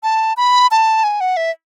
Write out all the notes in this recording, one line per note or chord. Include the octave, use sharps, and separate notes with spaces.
A5
B5
A5
G#5
F#5
E5